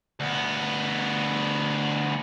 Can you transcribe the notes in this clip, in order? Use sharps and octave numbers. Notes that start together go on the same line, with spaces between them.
D2 B3